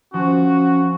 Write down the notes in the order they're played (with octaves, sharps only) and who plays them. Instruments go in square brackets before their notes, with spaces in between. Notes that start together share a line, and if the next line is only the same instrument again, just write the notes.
[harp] F3 [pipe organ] C#4 [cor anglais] F#4